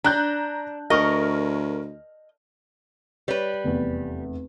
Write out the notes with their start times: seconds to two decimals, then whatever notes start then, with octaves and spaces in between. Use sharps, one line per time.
0.04 D4 A#5 F#6 G6
0.90 D2 A#4 D#5 C#6 F6
3.28 G3 B4 C#5
3.64 F1 E2